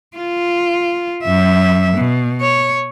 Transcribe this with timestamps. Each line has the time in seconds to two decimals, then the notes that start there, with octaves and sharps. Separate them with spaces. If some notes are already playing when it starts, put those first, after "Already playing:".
0.17 F4
1.24 F#2 E5
1.97 B2
2.41 C#5